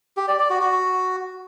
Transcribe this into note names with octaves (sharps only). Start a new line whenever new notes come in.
G4
D5
D5
F#4
F#4